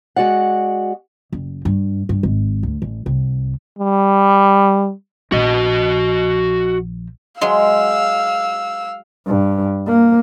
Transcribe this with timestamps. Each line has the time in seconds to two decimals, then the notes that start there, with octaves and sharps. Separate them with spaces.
0.16 G#3 F#4 D5 F#5
1.32 F#1
1.65 G2
2.09 G2
2.23 G#1
2.63 D2
2.82 A1
3.06 C2
3.79 G3
5.32 A#1 F3 F#4 D#5
7.41 F#3 G#3 F5 C6 E6
9.27 G2
9.87 A#3